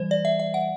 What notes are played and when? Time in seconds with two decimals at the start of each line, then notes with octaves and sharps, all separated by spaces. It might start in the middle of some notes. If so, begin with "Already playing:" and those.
Already playing: E3 G3 C5
0.11 D5
0.25 E5
0.40 E5
0.54 F#5